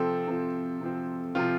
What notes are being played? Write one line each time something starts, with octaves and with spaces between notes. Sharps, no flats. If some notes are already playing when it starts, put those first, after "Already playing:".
Already playing: C3 F3 C4 A4
C3 F3 C4
C3 F3 C4
C3 F3 C4 F4